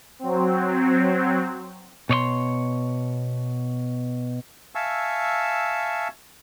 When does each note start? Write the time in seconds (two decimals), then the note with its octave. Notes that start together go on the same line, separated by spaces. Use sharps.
0.19 F#3 C4
2.09 B2 C#5 D5 C6
4.75 E5 F5 G#5 A5 C#6 E6